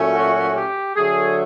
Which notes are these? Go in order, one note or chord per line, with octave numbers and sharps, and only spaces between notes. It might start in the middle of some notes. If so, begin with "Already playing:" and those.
Already playing: A#2 F#3 A3 C#4
F#4
G4
D3 F#3 A3 G#4